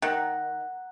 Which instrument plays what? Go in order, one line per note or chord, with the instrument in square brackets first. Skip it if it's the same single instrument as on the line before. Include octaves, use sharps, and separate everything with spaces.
[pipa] D#3 [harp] F#5 A#5